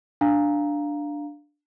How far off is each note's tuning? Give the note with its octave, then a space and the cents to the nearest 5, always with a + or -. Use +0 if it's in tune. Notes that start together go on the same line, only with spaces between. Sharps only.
D4 +0 F5 +0 A#5 +0